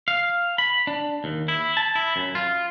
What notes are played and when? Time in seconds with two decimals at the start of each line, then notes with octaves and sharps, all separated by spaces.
0.08 F5
0.58 B5
0.87 D4
1.24 D#2
1.48 E4
1.77 A5
1.95 E4
2.16 F#2
2.35 F4